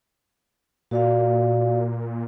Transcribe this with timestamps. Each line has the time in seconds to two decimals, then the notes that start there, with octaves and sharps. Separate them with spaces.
0.91 A#2 F#4 D5 F5